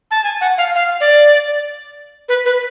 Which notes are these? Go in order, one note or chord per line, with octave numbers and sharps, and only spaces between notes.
A5
G#5
F#5
F5
F5
D5
B4
B4